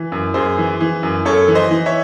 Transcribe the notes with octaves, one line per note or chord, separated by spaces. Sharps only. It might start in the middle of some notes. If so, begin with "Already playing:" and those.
Already playing: E3
F#2
F#2 G#4 C5
E3
E3
F#2
F#2 A4 C#5
E3
C5 D#5
E3
C#5 E5